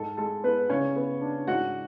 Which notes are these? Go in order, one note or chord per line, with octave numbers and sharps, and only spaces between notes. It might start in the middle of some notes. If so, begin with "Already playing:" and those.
Already playing: G#2 A4
G#3 A4
B3 B4
C#3 C#4 C#5
B3
D4
G#2 F#4 F#5